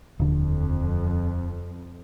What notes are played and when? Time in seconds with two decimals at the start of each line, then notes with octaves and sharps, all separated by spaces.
0.19 D#1 F2 D3